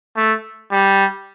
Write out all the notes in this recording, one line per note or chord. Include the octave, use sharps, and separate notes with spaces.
A3
G3